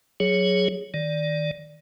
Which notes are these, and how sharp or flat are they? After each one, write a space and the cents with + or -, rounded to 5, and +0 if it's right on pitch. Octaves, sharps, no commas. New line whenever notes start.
F#3 +0 G#4 +0 C#5 +0
D#3 +15 D5 +0